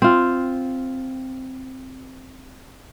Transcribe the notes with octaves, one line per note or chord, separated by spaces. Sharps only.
C4 F4